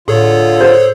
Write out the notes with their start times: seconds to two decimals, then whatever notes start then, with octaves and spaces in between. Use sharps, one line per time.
0.08 A2 D3 F4 G#4 A4 C#5
0.61 C5